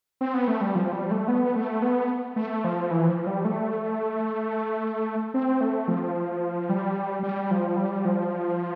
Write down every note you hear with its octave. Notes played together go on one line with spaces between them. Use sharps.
C4
B3
A3
G3
F3
G3
A3
B3
A3
B3
A3
F3
E3
F3
G3
A3
C4
A3
F3
G3
G3
F3
G3
F3